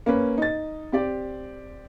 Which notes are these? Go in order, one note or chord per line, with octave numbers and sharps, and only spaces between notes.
A#3 C#4 B4
D#4 A6
C4 G4 D5